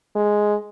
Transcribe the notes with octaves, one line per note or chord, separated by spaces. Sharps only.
G#3